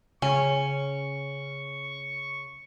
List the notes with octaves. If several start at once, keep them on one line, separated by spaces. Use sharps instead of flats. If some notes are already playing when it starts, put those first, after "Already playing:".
C#3 C#4 C#6